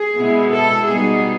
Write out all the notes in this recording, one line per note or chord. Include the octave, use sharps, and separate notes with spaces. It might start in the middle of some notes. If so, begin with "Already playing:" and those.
Already playing: G#4
B2 G#3 B3 E4
A4
B2 G3 B3 D#4 G#4